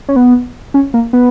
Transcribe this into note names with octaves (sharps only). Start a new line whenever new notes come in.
C#4
B3
C#4
A#3
B3